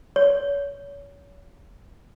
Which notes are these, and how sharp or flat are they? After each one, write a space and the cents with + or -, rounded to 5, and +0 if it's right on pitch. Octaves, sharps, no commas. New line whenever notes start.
C#5 +30